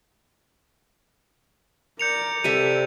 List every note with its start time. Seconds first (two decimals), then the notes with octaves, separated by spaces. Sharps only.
1.99 A#4 D5 G6 C#7 F7
2.44 C3 G3 A4 E5 D#7